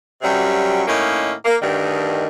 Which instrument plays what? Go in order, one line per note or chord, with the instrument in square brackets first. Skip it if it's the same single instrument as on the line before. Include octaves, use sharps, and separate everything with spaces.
[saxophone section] F#2 C3 F#3 G3
A2 D#3 A#3 C#4 D#4
A#3
D2 G2 D#3